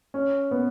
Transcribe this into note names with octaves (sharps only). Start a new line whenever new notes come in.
C#4
B3